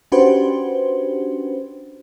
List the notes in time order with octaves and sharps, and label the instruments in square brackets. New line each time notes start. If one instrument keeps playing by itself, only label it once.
[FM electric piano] C#4 D4 F#4 G4 B4 C5